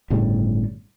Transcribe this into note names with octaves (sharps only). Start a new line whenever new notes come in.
G1 A2 C#3 G3